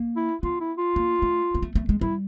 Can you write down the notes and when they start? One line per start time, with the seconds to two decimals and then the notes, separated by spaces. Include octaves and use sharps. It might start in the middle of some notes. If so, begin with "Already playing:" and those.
Already playing: A#3
0.17 E4
0.43 B3 F4
0.61 E4
0.78 F4
0.96 A#3
1.22 A3
1.55 A#3
1.62 A3
1.75 A3
1.89 G#3
2.01 G3 E4